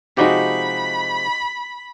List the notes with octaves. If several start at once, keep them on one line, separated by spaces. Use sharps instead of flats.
C3 F3 G#3 D#4 F#4 G4 B5